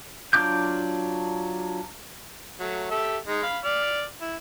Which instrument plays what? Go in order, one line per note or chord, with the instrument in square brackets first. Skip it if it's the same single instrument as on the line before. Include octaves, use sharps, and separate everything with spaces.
[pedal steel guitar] F#3 D4 F4 D6 G6
[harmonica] F#3 A3
G4 A4 E5
G#3 D#4
F5 B5
D5 F6
E4